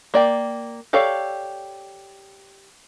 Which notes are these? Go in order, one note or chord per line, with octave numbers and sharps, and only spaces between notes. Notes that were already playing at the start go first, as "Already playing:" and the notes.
A#3 D5 G5
G4 A4 C#5 D5 F5